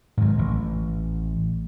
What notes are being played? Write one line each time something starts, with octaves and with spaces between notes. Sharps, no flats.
G#2 D#3 F#3
A1